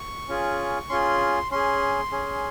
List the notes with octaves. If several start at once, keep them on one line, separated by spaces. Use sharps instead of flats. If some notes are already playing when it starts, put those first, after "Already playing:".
Already playing: C#6
C#4 F4 G#4
C#4 F4 G#4 C6
C#4 G#4 C6
C#4 G#4